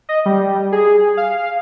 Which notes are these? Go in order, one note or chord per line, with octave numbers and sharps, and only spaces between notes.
D#5
G3
G#4
F5